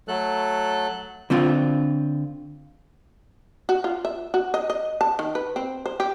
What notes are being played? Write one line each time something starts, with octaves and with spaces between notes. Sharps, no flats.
F#3 A3 A4 F#6
D3 C4 F4
F#4
F4
E5
F#4
D#5
D#5
A5
D#3
B4
C4
C5
G4